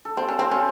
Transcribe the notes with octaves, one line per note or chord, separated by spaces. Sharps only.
A4
C4 C5
C#4
C4 C5
C#4